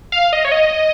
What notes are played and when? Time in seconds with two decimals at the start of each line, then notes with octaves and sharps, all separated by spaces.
0.12 F5
0.33 D#5
0.45 C#5
0.52 D#5